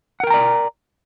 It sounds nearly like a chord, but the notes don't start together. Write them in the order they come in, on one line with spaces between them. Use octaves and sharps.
F#5 A#4 G5 A#5 D5